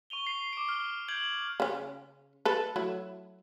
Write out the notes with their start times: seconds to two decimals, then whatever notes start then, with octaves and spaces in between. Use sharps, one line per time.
0.10 C#6 D#7 F7 G7
0.27 C7
0.53 D6 D7
0.69 F6
1.09 G6 G#6 D7 F#7
1.60 C#3 C#4
2.45 A4 B4
2.76 F#3 A3 E4